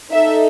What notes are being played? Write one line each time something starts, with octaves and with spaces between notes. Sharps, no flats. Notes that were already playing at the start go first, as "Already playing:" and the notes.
D#4 A4 E5